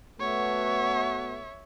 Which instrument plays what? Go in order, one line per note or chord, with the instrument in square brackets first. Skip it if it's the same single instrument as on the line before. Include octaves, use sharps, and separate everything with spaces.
[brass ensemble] A3 B3 F#4 [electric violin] C#5 E5